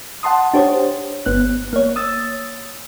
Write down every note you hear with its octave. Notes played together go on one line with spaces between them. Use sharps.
F#5 A5 C6 D#6
D4 G4 C5 C#5
G1 B3 F#6
A#3 C#5
D#6 E6 A6